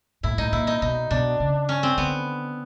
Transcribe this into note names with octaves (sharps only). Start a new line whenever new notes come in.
A2 E4
A2 D#4
A#2 E4
D#4
B2 D#4
B2 D4
C#3
C#4
C4
D3 B3